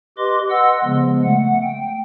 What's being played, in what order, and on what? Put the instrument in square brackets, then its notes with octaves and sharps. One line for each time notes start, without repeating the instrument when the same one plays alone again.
[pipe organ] G4 B4 D#5 C6 D6
B4 D#5 F#5 C6 E6
C#3 F3 G#3 B3
A3 F#5
G5